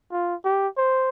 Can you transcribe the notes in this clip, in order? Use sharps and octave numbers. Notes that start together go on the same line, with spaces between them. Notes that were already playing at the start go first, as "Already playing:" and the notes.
F4
G4
C5